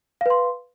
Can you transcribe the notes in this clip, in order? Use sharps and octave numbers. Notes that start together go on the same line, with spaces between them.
B4 F5 C6